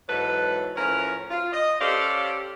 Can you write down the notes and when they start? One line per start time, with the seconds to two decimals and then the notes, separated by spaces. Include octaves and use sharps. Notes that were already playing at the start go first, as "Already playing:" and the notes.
0.07 G#2 E3 F#3 A4 B4
0.75 A2 F3 C#4 A#4 B4 C#5
1.30 F4
1.52 D#5
1.80 C#4 G4 A4 C5 D5 F5